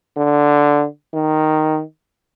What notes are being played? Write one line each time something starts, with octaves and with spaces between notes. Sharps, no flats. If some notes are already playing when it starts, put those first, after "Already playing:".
D3
D#3